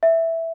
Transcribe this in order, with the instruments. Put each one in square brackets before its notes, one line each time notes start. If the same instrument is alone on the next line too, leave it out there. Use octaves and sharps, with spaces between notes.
[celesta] E5